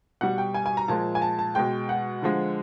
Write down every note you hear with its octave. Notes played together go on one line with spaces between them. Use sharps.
B2 G3 F#5
G5
G#5
G#5
A#5
A#2 F3 G#3 A5
G#5
A5
A5
B2 G#3 G5
F#5
D3 F3 G#3